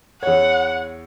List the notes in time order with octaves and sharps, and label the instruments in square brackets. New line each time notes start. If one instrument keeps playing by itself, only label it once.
[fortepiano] E2 C#5 [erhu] F#5